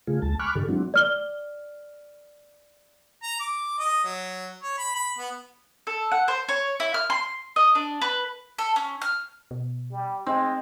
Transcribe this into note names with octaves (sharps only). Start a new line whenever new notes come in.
C#3 A3 F4 G#4
D2 G#3 A5
G#5 B5 C#6 D6 F6 F#6
G2 D3 D#3 G4 A4
F#3 G#3 C4 D4 E4 F#4
D5 F6 G7
A#5
D6
D#5
F#3
C#5
B5
B5
B3
A4
F#5
C5
C#5
E4
F6
C6
D#5
D4
B4
A4
C#4
F6
B2
G3
G#3 C4 D#4